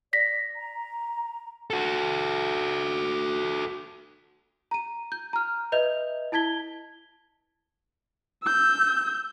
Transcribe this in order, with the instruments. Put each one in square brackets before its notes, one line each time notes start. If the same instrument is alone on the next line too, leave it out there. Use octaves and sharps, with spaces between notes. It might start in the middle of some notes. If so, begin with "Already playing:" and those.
[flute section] D5 [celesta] A#6 B6
[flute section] A#5
[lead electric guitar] F#4 A4
[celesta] A#5 D#7
G6
A#5 F6
B4 D#5 E5 G6 F7
E4 A5 G#6 B6 G7
[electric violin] E6 G6